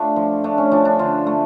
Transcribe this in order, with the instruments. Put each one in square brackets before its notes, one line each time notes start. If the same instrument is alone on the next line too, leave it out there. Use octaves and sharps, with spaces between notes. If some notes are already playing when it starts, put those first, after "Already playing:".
Already playing: [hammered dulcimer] A3 D4 F4 D5
F3
A3 D4
C#4
F3 D4
D4
D3 F4
A3